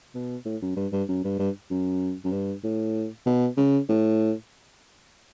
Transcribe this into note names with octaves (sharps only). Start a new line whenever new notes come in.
B2
A2
F#2
G2
G2
F#2
G2
G2
F#2
F#2
G2
A2
B2
C#3
A2